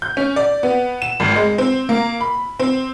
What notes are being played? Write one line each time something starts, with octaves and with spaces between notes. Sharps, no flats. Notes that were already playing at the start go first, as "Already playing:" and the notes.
G6
C#4
D5
B3
E7
G#1
G#3
C4
A#3
B5
C4